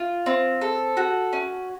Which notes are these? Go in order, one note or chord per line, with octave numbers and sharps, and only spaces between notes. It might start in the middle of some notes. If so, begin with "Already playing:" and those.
Already playing: F4
C4
A4
F#4
C#4